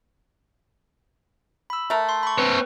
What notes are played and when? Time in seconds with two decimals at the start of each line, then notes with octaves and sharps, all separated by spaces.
1.70 B5 E6
1.90 A3 A#4
2.09 C6
2.23 B5 C#6
2.38 C4 B4 C#5